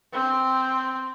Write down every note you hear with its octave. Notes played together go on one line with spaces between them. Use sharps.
C4